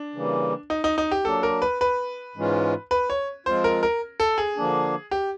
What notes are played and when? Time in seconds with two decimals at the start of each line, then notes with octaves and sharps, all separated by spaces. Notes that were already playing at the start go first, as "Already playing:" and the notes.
Already playing: D4
0.14 C#3 E3 G3 A#3
0.70 D#4
0.84 D#4
0.98 D#4
1.11 G4
1.25 F#3 A#3 D4 A4
1.43 A#4
1.62 B4
1.81 B4
2.36 G#2 E3 G#3 C#4 F4
2.91 B4
3.10 C#5
3.46 F3 G#3 C4 F4 C5
3.64 A#4
3.83 A#4
4.20 A4
4.38 G#4
4.56 D3 F3 A#3 D4
5.11 G4